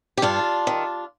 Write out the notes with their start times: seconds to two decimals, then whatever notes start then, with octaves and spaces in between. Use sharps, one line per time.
0.17 G4
0.22 G2 D4 F4
0.67 D#3